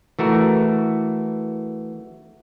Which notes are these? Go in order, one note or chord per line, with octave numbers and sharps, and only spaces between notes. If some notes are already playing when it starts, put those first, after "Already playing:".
E3 A3 F#4 A#4